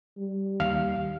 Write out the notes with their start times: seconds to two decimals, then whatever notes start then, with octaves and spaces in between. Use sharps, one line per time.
0.17 G3
0.60 D#2 F5 F6